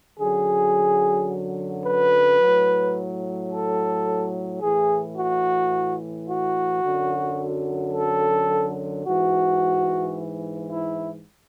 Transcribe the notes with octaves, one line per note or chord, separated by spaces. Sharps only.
F#2 D3 F#3 G#4
B4
A2 F#3
A4
A2 E3 G#4
F#4
F#4
F#2 D3 F#3
A4
G#2 E3 F#4
E4